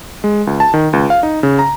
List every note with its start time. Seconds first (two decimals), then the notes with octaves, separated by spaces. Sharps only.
0.24 G#3
0.47 C#2
0.60 A5
0.74 D#3
0.93 C#2
1.10 F5
1.23 D#4
1.43 C#3
1.59 A#5